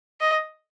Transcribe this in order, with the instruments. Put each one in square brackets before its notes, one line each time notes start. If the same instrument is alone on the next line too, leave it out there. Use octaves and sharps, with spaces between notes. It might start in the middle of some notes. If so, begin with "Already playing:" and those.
[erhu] D#5